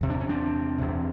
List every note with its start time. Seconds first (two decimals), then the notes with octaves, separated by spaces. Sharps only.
0.01 E2 C3
0.10 D4
0.20 C#4
0.29 C4 D4
0.78 E2 C3